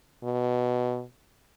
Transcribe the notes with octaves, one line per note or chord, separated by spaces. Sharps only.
B2